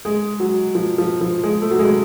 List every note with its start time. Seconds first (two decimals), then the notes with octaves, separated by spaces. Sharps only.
0.05 G#3
0.40 F#3
0.75 F3
0.98 F3
1.21 F3
1.43 G#3
1.62 A3
1.71 F#3
1.79 G#3